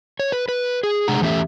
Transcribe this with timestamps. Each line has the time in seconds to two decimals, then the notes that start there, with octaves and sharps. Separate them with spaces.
0.20 C#5
0.32 B4
0.48 B4
0.83 G#4
1.08 C3 G#3 D4 G#4 F#5 A#5
1.22 E2 E3 A3 C#4 G4 E5